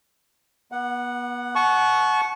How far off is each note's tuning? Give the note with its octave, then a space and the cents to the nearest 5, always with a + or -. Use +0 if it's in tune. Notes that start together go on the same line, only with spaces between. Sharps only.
B3 -35 F#5 +0
F#5 +0 A5 -35 C#6 +0